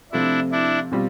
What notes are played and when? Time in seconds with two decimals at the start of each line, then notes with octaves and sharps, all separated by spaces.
0.12 C3 F3 A3 C4 D4 E4 F4
0.52 D4 E4
0.91 B2 G3 C4 F4